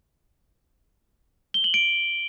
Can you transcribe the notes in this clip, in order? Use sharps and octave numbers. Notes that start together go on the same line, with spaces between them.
G7
F#7
D7